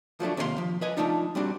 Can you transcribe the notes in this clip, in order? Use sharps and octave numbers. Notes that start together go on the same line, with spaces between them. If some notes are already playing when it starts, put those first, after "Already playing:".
F3 F#3 A3 D4
D#2 C3 D#4 F#4 F5 C6
F3
B4 D#5 G#5
F3 F#3 A3 D4 D#4 F4
G3 C4 D4 F#4